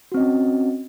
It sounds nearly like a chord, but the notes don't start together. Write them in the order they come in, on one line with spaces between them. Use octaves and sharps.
F#4 C4 D#5 C#4